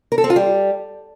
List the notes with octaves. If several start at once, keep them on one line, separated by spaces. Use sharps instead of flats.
A#4
A4
C4
F4
G3